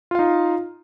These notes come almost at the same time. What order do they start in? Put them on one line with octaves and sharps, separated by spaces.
F4 F5 D#4